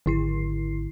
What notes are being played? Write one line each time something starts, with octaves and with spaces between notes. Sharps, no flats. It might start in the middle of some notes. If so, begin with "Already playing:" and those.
G#1 D3 E4 C7